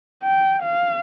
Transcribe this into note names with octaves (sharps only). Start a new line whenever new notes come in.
G5
F5